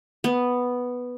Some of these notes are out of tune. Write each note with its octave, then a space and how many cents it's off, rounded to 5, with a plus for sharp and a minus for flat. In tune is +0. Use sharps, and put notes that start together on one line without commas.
B3 +0